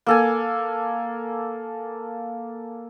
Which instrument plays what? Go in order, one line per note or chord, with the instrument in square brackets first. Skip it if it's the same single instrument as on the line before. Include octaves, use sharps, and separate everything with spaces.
[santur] A#3 A4 G#5